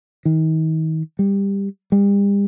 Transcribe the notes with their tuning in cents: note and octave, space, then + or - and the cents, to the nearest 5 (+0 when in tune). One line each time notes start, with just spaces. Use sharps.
D#3 +35
G3 +15
G3 +40